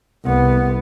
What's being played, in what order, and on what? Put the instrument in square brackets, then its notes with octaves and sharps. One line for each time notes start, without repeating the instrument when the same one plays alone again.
[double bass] C2 B3